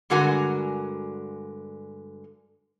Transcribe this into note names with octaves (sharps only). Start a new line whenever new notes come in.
G2 D3 G#3 F#4 A#4 G#5